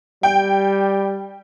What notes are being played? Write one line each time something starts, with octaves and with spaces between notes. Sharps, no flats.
G3 G5